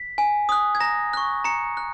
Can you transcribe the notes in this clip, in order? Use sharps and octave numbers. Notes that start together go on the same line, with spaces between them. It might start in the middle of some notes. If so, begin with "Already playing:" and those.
Already playing: B6
G#5
D#6 F#6
G#6
A#5 A#6
C#6 F#6
A#5 C#7
F#6